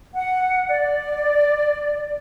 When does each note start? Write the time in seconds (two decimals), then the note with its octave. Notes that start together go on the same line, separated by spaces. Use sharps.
0.14 F#5
0.68 D5